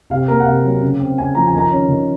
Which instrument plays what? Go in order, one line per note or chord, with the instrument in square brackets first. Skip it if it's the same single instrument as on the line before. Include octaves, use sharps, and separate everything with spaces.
[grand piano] C3 F5
A#3 A#4
F#5
C3 F5
F#3
C#3
C4
C#3 G#5
F3 A#5
G#5
D#3
A#5
C#4
D#3